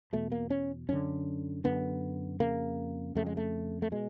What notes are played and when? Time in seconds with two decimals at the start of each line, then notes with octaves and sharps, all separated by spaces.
0.13 E2 B2 A3
0.32 A#3
0.50 C#4
0.89 F#2 D3 C#4
1.64 F#2 D3 B3
2.40 F2 C#3 A#3
3.15 F2 C#3 A3
3.26 G#3
3.37 A3
3.82 A3
3.92 B2 G#3